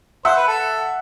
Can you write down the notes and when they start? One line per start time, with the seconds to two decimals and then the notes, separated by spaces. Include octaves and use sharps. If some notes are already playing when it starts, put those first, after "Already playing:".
0.25 C5 E5 F#5
0.36 B4
0.48 A4